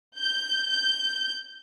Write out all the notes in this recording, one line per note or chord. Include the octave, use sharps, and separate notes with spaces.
G6
G6